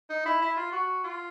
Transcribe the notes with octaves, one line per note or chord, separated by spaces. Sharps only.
D#4
E4
E4
F4
F#4
F4